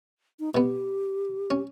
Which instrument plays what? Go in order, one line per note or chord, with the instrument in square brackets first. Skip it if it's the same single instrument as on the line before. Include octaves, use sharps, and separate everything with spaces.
[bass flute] D#4
[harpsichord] B2 B3 [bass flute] G4
[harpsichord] C#4